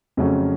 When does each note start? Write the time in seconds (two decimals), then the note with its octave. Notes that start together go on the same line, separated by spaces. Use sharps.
0.17 F2 C#3 F#3 A3 C#4